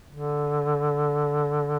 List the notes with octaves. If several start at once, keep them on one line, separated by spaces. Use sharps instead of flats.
D3